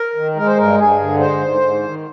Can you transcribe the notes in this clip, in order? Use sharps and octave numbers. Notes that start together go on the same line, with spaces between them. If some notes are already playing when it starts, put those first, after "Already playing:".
Already playing: A#4
D#3
G#3 A#4
C5
G2 A#4
G2 G#4
D3
G#3 C5
G#2
G#2
D#3